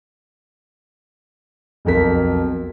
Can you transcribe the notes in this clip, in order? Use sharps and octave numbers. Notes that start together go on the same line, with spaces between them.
B1 F2 A#4 B6